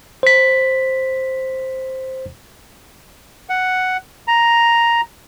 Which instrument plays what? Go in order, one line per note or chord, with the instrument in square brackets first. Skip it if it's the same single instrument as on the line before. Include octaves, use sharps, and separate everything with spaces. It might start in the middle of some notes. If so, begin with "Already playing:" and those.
[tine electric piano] C5 B6
[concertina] F#5
A#5